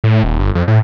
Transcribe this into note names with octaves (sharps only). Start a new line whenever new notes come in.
A2
D#1
G1
F2
A2